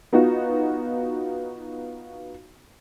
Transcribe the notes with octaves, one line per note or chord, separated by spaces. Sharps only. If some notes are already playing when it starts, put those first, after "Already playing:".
B3 D#4 F4 F#4